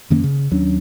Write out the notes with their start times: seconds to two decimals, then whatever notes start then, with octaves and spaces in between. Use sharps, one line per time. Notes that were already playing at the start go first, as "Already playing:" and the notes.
0.10 F#2 D#3 A#3 C#4
0.24 C#3
0.51 D#2 F#3 C#4 D4